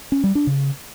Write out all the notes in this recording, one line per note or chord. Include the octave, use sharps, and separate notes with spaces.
C#4
G3
D4
C#3